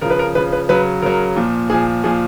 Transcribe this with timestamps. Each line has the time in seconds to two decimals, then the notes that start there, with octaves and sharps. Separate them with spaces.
0.01 C#3 F3 A#4
0.10 B4
0.19 A#4
0.35 C#3 B4
0.39 F3
0.52 B4
0.69 C#3 F#3 B4
1.02 C#3 F#3 A#4
1.36 A#2 F3
1.70 A#2 F3 G#4
2.04 A#2 F3 G#4